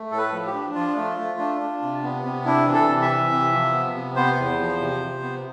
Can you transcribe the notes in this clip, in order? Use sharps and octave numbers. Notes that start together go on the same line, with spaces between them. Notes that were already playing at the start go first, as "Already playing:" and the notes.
Already playing: A3
A2 A4
B4
F3
G4
D4
F3 F4
A3
A3
D4
D4
C3
B3
C3
D4 E4
E3
A4
C3
E5
E3
C3
F3
B3
C3
B3 C5
E2
F3
C3
C3
B3